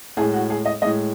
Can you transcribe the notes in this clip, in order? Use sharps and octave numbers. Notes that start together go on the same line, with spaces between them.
A2 G#3 G#4
F#4
G#4
D#5
A2 G#3 D#5